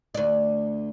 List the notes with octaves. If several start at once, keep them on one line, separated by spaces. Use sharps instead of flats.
D2 D5